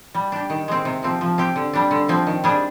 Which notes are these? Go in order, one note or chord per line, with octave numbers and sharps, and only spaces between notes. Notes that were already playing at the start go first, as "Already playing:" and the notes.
G3
D4 G4
D#3
G#3 C4
C3
F3 C4
F3
C4 G4
D3
G3 D4
D3
F3 C4
D#3
G3 D4 G#4